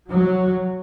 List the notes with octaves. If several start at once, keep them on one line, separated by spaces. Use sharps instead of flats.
F#3